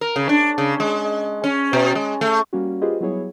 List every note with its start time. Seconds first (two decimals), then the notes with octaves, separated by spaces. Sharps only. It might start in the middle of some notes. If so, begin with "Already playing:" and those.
0.01 A#4
0.16 C#3
0.29 D4
0.58 C#3
0.80 G#3
1.44 C#4
1.73 B2
1.95 G#3
2.21 A3
2.53 G3 A#3 C#4 F#4
2.81 F4 G4 G#4 B4 C5 D#5
3.01 F#3 G3 B3 E4 G#4 C#5